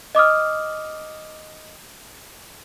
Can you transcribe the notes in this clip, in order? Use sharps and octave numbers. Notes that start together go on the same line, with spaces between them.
D#5 D6 D#6 F6